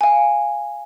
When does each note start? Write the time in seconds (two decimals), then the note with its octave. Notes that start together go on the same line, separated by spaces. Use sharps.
0.01 F5 G#5